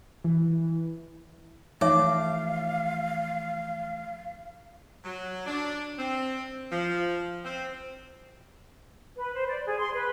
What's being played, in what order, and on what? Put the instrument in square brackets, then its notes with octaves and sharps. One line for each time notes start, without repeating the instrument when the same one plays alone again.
[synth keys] E3
[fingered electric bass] E3 F3 A3 [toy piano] D#4 C#5 E5 [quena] F5 [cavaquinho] D6
[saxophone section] F#3
D4
C4
F3
C4
[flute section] B4
C5
D5
G#4
C6
B4